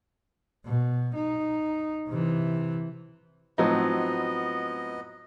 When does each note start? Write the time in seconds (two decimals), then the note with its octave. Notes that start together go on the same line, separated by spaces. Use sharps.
0.65 B2
1.15 D#4
2.08 C3 E3
3.58 A2 F3 F#3 B3 C4 D#4 D#5